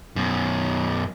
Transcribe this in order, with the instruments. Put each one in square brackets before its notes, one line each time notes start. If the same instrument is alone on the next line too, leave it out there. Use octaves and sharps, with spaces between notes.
[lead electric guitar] F#2 B2